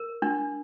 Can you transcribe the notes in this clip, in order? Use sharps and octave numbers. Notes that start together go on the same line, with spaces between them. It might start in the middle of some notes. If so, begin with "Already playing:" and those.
Already playing: A#4
D4